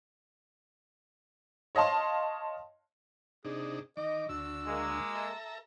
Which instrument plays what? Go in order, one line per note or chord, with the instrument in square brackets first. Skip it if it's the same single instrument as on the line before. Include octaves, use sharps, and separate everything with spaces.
[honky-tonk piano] C#5 D#5 F5 A5 C6
[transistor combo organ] C3 D4 D#4 [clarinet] G#4
[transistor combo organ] D#3 D6 [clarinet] D#5
[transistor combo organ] D2 D3 [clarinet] F#4 [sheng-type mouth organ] E6
[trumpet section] G#3 A#3
[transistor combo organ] A4 E5 A#5